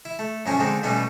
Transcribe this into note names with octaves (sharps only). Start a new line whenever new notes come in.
E4
A3
F#2 A#2 F3 A#3 C#4 C#6
D3 D#3 F3 G#3 C4
B2 E3 G3 A3 B3 C#4